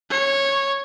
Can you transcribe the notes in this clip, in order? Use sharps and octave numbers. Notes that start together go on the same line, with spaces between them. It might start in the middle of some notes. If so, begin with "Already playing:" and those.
C#5